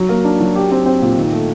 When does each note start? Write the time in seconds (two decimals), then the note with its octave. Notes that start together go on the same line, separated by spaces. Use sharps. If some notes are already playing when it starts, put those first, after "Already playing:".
Already playing: F#3
0.09 A#3
0.25 D4
0.41 F#3
0.55 G4
0.72 C4
0.86 C4
1.02 A#2
1.17 D#3
1.32 A3